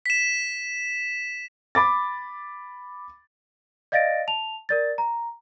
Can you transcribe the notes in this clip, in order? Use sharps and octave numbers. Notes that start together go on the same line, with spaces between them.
B6 E7
B5 D6 A6
D5 D#5 F5 A6 A#6 D7
A5 F7
A#4 D5 A6
A#5